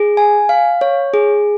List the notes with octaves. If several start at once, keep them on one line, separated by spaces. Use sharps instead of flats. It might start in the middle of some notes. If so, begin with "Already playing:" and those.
Already playing: G#4
G#5
F5
C#5
G#4